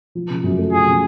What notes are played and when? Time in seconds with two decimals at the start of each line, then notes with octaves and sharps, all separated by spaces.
0.15 F3
0.30 C#3
0.44 F#2
0.59 A3
0.72 F3 G#4
0.87 C#3